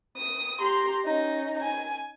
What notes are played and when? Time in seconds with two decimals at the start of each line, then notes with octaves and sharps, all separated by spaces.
0.17 D#6
0.60 G4 A#5 C6
1.06 C#4 D#4
1.63 G#5